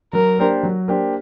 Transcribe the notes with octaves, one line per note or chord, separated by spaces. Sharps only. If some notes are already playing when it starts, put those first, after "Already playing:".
F#3 A#4
A#3 D4 G4 C5
F#3
A#3 D4 G4 C5